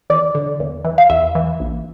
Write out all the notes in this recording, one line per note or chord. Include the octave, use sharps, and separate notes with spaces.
E2 D5
D3
E2
E3
F5
E2 E5
E3
A#1